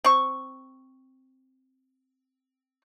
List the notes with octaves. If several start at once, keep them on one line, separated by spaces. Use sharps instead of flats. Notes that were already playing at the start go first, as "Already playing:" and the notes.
C4 C#6